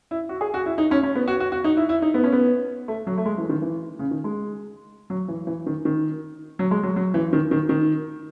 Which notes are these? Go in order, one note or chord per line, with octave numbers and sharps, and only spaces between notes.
E4
F#4
G#4
F#4
E4
D#4
C#4
C#4
B3
F#4
F#4
F#4
D#4
E4
E4
D#4
B3
C#4
B3
A3
F#3
A3
G#3
E3
D#3
E3
C#3
D#3
G#3
F#3
E3
E3
D#3
D#3
F#3
G#3
F#3
F#3
E3
D#3
D#3
D#3